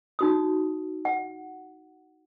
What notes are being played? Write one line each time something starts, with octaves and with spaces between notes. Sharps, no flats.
D#4 F#4 D#6
F#5